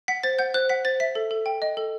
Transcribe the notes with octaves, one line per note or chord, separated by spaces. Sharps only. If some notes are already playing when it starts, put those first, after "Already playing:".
F#5 B6
C5 A6
F#5 G6
C5 F#6
F#5 B6
C5 A6
E5 B6
A4
A4
G5
D#5
A4